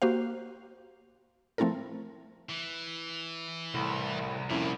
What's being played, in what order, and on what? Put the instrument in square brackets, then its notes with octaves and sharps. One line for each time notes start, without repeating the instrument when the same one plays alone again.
[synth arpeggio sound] A#3 F#4 G4 C5 F5
F3 A3 C4 E4 A4 A#4
[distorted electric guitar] E3
[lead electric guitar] C2 [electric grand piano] A2
[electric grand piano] F2 C#4 E4 [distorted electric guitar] A#2